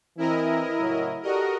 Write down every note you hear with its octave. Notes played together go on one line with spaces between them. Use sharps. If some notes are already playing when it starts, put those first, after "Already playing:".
E3 C4 E4 A#4 D#5
A2 C#3 F#3
F#4 G4 A4 A#4 D5 D#5